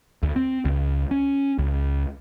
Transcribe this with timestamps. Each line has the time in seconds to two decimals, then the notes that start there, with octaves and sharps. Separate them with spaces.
0.23 D2
0.36 C4
0.65 C#2
1.11 C#4
1.58 C#2